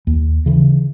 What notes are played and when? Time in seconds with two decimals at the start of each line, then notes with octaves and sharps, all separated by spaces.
0.07 D#2
0.46 C#3 E3